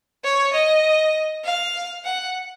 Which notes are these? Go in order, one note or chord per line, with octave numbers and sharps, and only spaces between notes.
C#5
D#5
F5
F#5